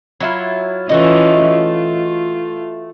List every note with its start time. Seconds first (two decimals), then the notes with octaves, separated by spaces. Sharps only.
0.20 F#3 E4 F4
0.89 E3 A3 C#4 F4 F#4 D#5
1.51 F4